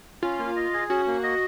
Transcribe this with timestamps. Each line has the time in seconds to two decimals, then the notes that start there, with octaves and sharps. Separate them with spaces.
0.23 C#4 F4
0.39 A#3
0.56 D#5
0.74 G#4
0.89 C#4 F#4
1.07 A#3
1.23 D#5